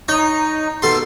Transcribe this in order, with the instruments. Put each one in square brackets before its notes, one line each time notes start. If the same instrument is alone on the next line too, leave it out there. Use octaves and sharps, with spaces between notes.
[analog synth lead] D#4 [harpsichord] C#5
[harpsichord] B2 A4 C6